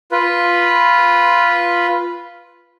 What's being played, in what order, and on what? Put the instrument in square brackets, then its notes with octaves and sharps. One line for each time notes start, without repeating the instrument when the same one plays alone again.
[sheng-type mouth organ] F4 B4